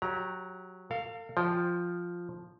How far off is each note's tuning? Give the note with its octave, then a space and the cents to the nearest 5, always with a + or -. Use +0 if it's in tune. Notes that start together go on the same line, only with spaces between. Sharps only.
F#3 -10 G4 +0 A#5 +20
A4 +45 F5 +0
F3 +0 G5 +0